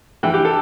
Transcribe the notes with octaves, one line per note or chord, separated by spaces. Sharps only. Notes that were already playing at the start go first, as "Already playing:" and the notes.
E3 G5
G4
A4